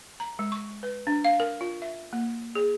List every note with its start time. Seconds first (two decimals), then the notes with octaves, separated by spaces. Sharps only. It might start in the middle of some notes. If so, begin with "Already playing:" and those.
0.20 A#5
0.39 G#3
0.52 C#6
0.83 B4
1.07 D4
1.25 F5
1.40 A#4
1.61 F4
1.82 E5
2.13 A#3
2.55 G#4